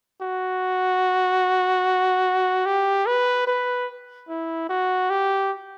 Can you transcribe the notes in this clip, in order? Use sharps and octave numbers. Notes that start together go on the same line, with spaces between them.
F#4
G4
B4
B4
E4
F#4
G4